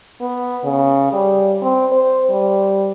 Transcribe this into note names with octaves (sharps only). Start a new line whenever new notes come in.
B3
C#3
G3
C4
C5
G3